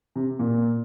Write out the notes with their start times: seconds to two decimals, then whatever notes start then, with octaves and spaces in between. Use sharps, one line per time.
0.16 C3
0.39 A#2